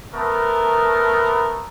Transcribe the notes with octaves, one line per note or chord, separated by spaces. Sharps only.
A3 B3 A#4